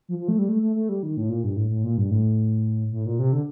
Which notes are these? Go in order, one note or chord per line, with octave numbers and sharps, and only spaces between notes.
F3
F3
A3
G3
A3
A3
A3
G3
D#3
A2
A#2
G2
A2
A2
A#2
G2
A2
A2
A#2
C3
D3